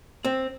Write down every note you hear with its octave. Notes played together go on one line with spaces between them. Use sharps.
C4